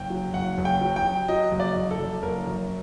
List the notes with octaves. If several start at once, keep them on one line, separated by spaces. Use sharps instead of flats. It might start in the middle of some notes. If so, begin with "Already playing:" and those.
Already playing: F#1 G5
F#3
F#1 F#5
F#1
G5
F#3
G5
F#3
F#3 D#5
F#1
D5
F#1
A4
F#2
F#1 A#4
F#2